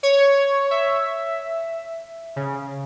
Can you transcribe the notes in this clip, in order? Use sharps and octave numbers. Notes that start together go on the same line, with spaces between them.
C#5
E5
C#3